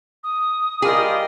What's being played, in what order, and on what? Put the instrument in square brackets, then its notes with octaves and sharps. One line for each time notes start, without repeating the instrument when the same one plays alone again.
[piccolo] D#6
[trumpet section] G3 F4 G4 [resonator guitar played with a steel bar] G#4 [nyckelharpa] A#4 D#5